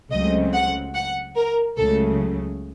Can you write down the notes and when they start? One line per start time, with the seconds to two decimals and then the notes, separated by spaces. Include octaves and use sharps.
0.11 C#2 C#3 F#3 A3 C4 D#5
0.53 F#5
0.94 F#5
1.36 A#4
1.77 C#2 C#3 F#3 A3 A4